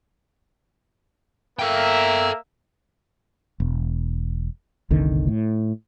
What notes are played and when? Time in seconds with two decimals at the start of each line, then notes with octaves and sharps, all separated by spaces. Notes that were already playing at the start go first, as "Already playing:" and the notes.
1.59 A#3 A4 E5 G5
3.60 E1
4.90 F#1 C2 D3 D#3
5.28 A2